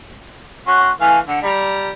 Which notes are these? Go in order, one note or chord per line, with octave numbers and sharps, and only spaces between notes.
C#4 F#4 C6 F#6
E3 A3 F5 G#5
D3 F#5
G3 A#5